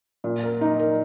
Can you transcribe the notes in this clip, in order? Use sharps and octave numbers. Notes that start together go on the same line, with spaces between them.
A#2
A#4
D#4
A#4